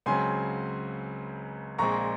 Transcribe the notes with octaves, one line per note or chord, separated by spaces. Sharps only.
C#2 C#3 F#3 C4 G#5 C6
A#1 A#2 G#3 C4 A#5 C#6